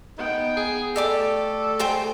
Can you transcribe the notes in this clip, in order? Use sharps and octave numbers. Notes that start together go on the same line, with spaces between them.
B3 D#4 G5
G#4
A3 G4 A4 D5 D6
G#4 C5 G5